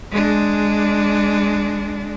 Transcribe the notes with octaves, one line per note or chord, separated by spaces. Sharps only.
G#3 D4